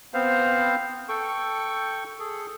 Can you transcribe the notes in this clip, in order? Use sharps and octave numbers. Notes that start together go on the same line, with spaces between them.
B3 C4 C5 F5
A4 G5 C#6
G#4 A4